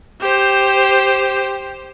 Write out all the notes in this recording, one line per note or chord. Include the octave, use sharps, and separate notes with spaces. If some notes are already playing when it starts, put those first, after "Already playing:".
G4 C5